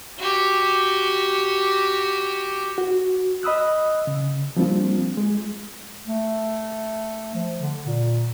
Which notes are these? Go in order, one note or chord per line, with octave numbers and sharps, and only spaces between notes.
F#4 G4
F#4
D#5 B5 D#6 E6 F#6
C#3
F3 G3 A#3 C4 D4 F4
G#3
A3
F3
D3
A#2